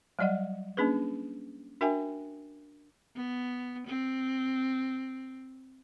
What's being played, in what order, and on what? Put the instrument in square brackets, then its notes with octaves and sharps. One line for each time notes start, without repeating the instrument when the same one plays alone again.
[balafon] F#3 G3 D5 D#5 F#5
A#3 C#4 D4 G#4 B4
D4 F#4 A#4 E5 G5 G#5
[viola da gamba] B3
C4